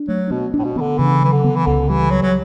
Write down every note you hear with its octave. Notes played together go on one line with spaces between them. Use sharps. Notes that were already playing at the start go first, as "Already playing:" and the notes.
Already playing: D4
F#3 A3
B2 B3
D4
A2
B2
E3 B3
D3
C#3 E3
E3 F#3
D3
B3
E3
C#2 D3
E3 G3
F#3 G3
F#3